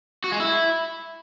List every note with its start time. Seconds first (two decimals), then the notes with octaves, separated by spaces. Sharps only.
0.24 F#4
0.32 G#3
0.40 E4